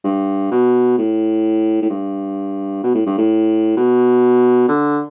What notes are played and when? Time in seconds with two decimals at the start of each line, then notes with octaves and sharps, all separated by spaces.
0.04 G2
0.51 B2
0.98 A2
1.82 A2
1.90 G2
2.83 B2
2.95 A2
3.07 G2
3.18 A2
3.77 B2
4.69 D3